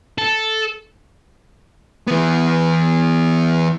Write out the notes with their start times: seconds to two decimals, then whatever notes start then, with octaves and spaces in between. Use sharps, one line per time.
0.18 A4
2.07 E3 B3